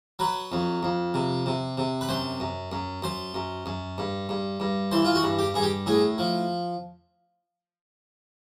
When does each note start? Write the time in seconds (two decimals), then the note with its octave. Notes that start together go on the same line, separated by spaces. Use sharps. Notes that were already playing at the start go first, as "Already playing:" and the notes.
0.19 F#3 B4
0.52 F2
0.83 F2
1.14 C3
1.46 C3
1.78 C3
2.01 B4
2.09 F#2 C5
2.40 F#2
2.72 F#2
3.03 F#2 C5
3.34 F#2
3.66 F#2
3.98 G2
4.29 G2
4.60 G2
4.91 E3 C5
5.05 F4
5.15 F#4
5.23 G2
5.39 G4
5.54 G2 G#4
5.62 G4
5.86 A2 G#4
6.18 F3